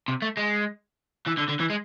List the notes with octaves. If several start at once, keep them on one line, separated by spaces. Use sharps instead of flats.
C3
A3
G#3
E3
D3
D3
E3
G#3